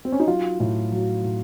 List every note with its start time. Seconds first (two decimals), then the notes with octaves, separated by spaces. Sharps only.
0.05 C4
0.12 C#4
0.20 D#4
0.27 F#3 F4
0.60 A2
0.92 F#3
1.24 A2